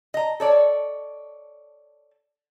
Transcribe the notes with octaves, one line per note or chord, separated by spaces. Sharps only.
D#5 A#5
A4 C#5 D5